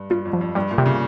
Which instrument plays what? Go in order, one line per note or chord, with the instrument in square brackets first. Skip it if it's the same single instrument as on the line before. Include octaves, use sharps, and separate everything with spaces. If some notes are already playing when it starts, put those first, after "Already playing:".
Already playing: [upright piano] G2
[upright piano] G2 [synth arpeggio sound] F4
[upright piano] F2
[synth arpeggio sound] F3
[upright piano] F2
[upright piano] G2 [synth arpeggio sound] G3
[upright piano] A#2
[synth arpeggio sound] C3
[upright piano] C#3